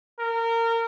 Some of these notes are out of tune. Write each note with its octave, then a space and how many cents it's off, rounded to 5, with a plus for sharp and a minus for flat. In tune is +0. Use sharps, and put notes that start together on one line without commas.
A#4 -25